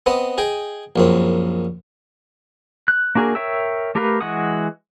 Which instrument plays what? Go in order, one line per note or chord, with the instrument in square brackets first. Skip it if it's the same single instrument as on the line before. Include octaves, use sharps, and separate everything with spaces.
[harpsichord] B3 C4 D#5
G#4 D#5 G5
A#1 F#2 C4
[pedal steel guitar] F#6
A#3 D4 F#4 G#4 A#4
A#4 C#5 E5 G5 E6
A3 G4 A#4 B4 F5
E3 G#3 F#4 F#5 D#6